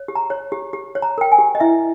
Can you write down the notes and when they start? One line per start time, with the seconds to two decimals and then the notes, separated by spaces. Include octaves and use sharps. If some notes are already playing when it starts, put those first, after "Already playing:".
Already playing: C#5
0.08 G4
0.15 A#5
0.30 C#5
0.52 G4
0.73 G4
0.95 C#5
1.02 A#5
1.18 A#4 G5
1.32 G#5
1.38 G4
1.55 D#5
1.60 E4 E5